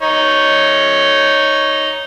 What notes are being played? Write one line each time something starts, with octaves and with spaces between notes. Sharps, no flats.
D#4 C#5